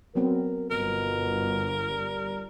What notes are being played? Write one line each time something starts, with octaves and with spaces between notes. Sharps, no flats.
F#3 B3 C4 A#4
G1 B2 A#4
G3